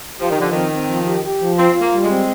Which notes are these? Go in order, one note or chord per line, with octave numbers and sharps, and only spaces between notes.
F3 G4
D#3
D3 F3
D#3 C4
C4
F3
G4
G4
F3
C4 F4
F4
A#3
G3
G#3
C4